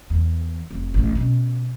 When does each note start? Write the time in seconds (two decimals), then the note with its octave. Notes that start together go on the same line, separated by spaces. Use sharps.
0.10 E2
0.71 F1
0.94 A1 A3
1.15 B2 C#4